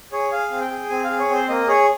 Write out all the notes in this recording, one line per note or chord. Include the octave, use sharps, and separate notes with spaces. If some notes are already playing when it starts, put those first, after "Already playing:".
G#4 C#5
G#4 F5
C4
G5
G#4
C4 G#5
G#4 F5
C#5
C4 C5
A#3 D#5
G#4 C#5